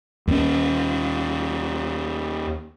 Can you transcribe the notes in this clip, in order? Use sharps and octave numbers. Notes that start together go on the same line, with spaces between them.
D#2 C#4